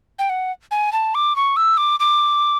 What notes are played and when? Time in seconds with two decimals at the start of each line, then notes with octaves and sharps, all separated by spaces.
0.19 G5
0.29 F#5
0.71 G#5
0.93 A5
1.15 D6
1.36 C#6
1.56 E6
1.77 D6
2.00 D6